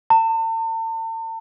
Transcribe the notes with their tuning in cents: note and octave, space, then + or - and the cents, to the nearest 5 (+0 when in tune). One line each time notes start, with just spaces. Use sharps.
A5 +40